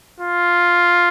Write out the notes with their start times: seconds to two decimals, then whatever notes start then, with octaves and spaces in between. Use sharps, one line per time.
0.20 F4